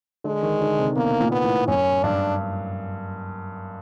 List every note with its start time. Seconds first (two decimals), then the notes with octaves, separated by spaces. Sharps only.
0.24 D3 G#3
0.43 D#3
0.61 D3
0.79 C3
0.96 B2 A#3
1.20 A#2
1.32 B3
1.44 A2
1.68 F#2 C#4
2.03 G2 D4